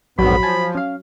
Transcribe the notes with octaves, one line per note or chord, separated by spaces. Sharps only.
A#1 F2 G#2 F#3 B3 B5
F3 G#5 A5
C#4 F5